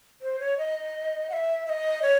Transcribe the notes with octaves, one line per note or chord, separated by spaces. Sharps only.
C5
C#5
D#5
F#5
E5
E5
D#5
C#5